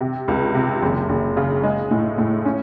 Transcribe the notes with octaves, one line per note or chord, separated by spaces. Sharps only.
C3
C#2
C3
F#1
F#1
C#3
G#3
A2
A2
C#4